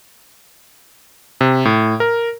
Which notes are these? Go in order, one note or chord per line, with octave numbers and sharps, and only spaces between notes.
C3
A2
A#4